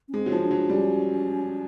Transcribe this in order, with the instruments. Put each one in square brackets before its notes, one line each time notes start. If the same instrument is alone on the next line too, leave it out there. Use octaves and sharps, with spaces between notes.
[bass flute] C#4
[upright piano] G#3 [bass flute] C4
[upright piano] F#3
F3
[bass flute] D4
[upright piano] F#3
[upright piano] G3 [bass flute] C#4